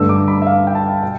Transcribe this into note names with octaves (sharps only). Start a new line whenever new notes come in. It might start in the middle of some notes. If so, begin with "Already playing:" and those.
Already playing: G2 D3 A3 E6
D6
B5
E5
F5
G5
A5
B2 G5